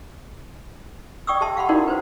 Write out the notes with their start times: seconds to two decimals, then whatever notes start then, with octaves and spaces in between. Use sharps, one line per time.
1.27 D5 G5 C#6 D#6 E6
1.41 G4 E5 A5 C6
1.57 F5 F#5 B5 C6
1.69 C#4 D#4 E4 F#4 A#4 D5
1.88 B4 C5